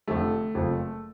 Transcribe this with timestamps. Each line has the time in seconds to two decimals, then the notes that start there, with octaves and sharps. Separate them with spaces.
0.07 F1 F2 D3 F3 A3
0.54 F#1 F2 C#3 F3